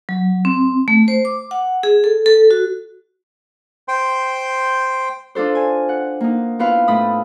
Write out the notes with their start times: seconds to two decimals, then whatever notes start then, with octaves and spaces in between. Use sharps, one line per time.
0.09 F#3
0.45 C4
0.88 A3
1.08 C5
1.25 D6
1.51 F#5
1.83 G#4
2.04 A4
2.26 A4
2.51 F#4
3.88 C5 G5 C6
5.35 D4 F4 A4 C5
5.55 G#5
5.89 F#5
6.21 A#3 D#4
6.59 B3 E4 F4 B4 F5
6.88 A2 A3 B5 D#6